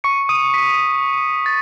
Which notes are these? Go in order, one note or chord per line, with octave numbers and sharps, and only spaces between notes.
C#6 C#7
D#6 D#7
B6
A6